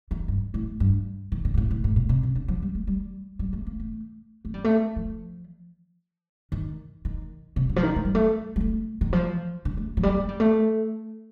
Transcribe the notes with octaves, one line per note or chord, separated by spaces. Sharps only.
D#3
G2
A2
G2
D#3
D3
A#2
A2
A2
A2
A#2
C3
C3
D3
F3
G3
A3
G3
G3
A3
A#3
A3
A3
G3
A3
F3
D#3
D#3
C3
D3
F3
D#3
A3
G3
A3
G3
A3
D#3
F3
D3
A3
F3
G3
A3
G3
A3